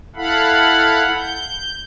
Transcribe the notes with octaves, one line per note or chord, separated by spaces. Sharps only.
E4 A4 F5 F#5 B5
G6